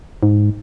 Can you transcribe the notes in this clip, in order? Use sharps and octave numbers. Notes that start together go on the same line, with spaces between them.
G#2